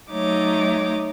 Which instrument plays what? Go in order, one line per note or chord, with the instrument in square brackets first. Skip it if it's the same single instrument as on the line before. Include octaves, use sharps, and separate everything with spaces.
[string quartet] F#3 A3 D#4 C#5 D6